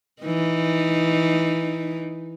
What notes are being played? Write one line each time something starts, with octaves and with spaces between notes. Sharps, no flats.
E3 D#4